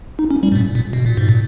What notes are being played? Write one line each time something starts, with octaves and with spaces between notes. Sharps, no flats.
D#4
C#4
G3
G#2
A#2
A#2
B2
A#2
G#2
A#2